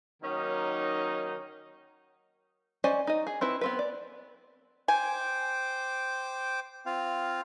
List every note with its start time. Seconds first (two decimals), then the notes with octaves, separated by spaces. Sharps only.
0.23 D#3 F#3 A#3 C#4 D#4
2.84 C#4 C5 D5 D#5 G#5
3.07 D#4 D#5
3.27 G#4
3.41 C4 E4 B4
3.61 B3 C4 B4
3.79 D5
4.88 C5 G5 G#5 D6
6.86 C4 F4 F5